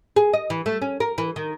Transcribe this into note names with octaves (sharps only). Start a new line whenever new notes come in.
G#4
D#5
E3
A3
C#4
A#4
E3
D#3